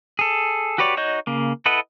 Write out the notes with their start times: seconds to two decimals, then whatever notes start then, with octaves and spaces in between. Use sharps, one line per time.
0.19 G#4 A4
0.78 F#4 G4 B4 C#5 D5
0.97 D#4 F#4 C#5 D#5 G6
1.27 C#3 A#3
1.66 E4 A4 B4 D#5 F#5